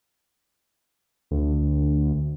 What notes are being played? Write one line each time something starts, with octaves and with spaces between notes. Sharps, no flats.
D2